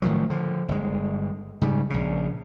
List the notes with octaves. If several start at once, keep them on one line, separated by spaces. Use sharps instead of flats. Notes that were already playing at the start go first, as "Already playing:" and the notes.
A2 D#3 F3 F#3
D3 F3
G1 G#3
G#2 C#3 G3
A#1 C#3